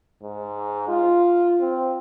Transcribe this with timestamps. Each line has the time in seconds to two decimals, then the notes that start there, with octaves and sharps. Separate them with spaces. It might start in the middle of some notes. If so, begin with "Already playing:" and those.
0.22 G#2
0.89 F4
1.61 C4